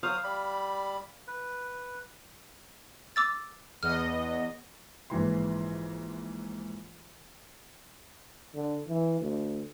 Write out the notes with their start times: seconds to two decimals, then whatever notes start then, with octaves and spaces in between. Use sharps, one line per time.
0.03 F#3 C5 F5 D#6
0.24 G3 B5
1.27 B4
3.16 D6 E6 A6
3.83 E2 B3 D#5 F6
5.10 A#1 G#2 E3 C6
8.55 D3
8.88 E3
9.20 D2